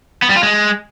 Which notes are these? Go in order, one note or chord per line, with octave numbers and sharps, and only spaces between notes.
B3
G3
F4
G#3